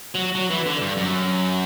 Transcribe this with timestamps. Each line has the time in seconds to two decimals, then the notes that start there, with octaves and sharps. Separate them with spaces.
0.15 F#3
0.35 F#3
0.50 E3
0.66 D3
0.81 G2
0.97 F#2